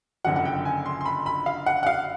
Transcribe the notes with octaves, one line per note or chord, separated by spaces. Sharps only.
F#1 F2 D3 F3 F#5
F#5
G5
G#5
C6
C6
B5
B5
F5
F#5
F#5
F5